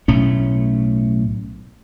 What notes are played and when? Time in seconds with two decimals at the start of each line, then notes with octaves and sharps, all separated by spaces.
0.08 B1 A2 A3 C#4